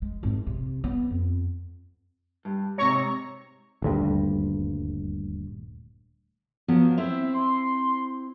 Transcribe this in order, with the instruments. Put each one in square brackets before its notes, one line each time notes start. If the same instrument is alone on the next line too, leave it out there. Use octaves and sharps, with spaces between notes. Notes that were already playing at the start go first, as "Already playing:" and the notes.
[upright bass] G#3
G#1
C3
B3
F2
[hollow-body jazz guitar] G2
[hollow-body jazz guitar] G#2 C3 [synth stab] C#5 A#5 C#6
[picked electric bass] D#1 D2 G2
[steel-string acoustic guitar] F3 F#3 [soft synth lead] B3
[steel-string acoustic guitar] C4 E4 C5 [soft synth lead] E5
[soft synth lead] C6